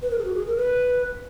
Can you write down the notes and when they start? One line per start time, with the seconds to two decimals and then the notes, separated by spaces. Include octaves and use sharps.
0.02 B4
0.10 A#4
0.18 G#4
0.25 F#4
0.35 G#4
0.47 A#4
0.57 B4